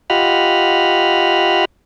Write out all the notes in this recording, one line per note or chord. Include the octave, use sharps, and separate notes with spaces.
F4 G4 D#5 F#5 B5 F6